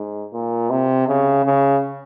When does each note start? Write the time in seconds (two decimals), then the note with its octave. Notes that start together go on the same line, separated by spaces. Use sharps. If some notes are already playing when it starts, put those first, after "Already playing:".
Already playing: G#2
0.33 A#2
0.70 C3
1.08 C#3
1.45 C#3